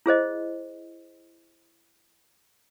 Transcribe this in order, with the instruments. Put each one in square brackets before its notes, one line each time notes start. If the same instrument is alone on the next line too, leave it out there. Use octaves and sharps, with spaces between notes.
[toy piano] E4 G#4 C5 D#5